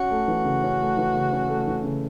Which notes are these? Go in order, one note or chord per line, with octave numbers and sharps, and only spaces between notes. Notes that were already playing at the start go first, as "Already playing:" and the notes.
Already playing: C#4 F#4
A3
E3
C#3
C#4
A3
E3
C#3
C#4
A3
E3
C#3